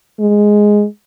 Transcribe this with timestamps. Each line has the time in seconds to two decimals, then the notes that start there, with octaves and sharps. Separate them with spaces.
0.20 G#3